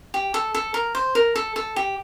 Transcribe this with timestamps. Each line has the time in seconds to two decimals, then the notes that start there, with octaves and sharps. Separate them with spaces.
0.14 G4
0.34 A4
0.55 A4
0.74 A#4
0.95 C5
1.15 A#4
1.36 A4
1.56 A4
1.76 G4